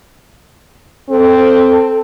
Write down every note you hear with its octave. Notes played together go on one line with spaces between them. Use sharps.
C4 A4